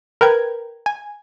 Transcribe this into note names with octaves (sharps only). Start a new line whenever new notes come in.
A#4 B4 G5 G#6
G#5